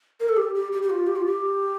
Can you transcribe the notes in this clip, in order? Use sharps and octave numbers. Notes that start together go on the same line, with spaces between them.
A#4
A4
G4
G4
G4
G4
F4
G4
F4
G4